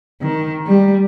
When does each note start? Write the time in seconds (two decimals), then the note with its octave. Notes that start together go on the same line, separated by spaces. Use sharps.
0.22 D#3
0.67 G3